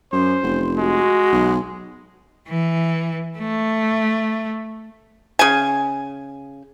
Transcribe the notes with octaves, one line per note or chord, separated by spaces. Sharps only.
F#2 C#4 C5
F1
G#3 F#4
B1
E3
A3
C#3 G#5